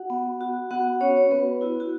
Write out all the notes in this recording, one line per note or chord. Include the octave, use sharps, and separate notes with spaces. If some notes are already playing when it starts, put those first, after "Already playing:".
Already playing: F#4 F#5
B3
F#4
B3 F#4 F#5
C#4 F#4 C#5
B3 B4
E4 F#4
F#4